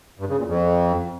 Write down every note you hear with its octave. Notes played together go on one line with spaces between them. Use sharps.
G2
C#3
A#2
F2